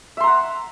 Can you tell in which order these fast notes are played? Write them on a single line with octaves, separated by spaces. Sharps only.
E5 C6 A#5 F#5